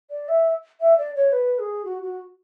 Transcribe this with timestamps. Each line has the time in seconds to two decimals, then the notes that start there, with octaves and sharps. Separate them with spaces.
0.11 D5
0.28 E5
0.80 E5
0.98 D5
1.15 C#5
1.32 B4
1.59 G#4
1.85 F#4
2.02 F#4